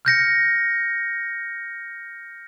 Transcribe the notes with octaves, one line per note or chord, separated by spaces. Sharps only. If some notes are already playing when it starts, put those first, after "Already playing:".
F6 G6 A#6 C#7